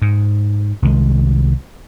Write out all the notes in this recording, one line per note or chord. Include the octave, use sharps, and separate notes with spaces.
G#2
C2 D#3 F3 G#3